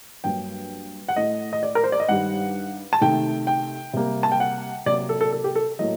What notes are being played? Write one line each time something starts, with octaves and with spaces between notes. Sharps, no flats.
G2 F#3 A#3 G5
F#5
A2 A3 D#5
D#5
D5
A#4
C5
D5
D#5
G2 D#3 G3 F#5
A5
C3 D#3 A3 G5
G5
C3 G3 A#3
A5
G5
F#5
C3 F#3 A#3 D5
A4
A4
A4
G4
A4
A2 F#3 A#3 D#5